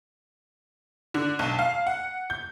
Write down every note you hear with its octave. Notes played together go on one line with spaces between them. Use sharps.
D3
B1
F5
F#5
G6